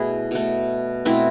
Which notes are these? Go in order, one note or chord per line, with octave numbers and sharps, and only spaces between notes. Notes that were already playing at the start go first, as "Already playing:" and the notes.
Already playing: B2 A3 E4 G#4
B2 A3
B2 A3 C4 E4